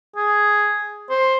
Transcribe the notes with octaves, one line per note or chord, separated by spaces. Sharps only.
G#4
C5